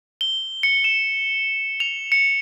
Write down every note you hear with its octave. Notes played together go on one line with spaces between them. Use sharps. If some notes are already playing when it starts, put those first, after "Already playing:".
G7
C#7
E7
F7
C#7